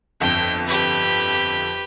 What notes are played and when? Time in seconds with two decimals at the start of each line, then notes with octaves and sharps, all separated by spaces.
0.21 G1 F2 G5
0.66 G4 B4